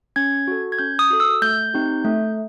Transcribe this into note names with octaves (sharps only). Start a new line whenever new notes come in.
C#4 G#6
F#4 A4
G#6
C#4 G6
D#6
F#4 A4
E6
A3 G6
C4 D#4 G4
A3